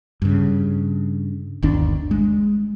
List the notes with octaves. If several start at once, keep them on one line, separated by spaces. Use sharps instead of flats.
G2 C#3
G1 D#2 D4
G#3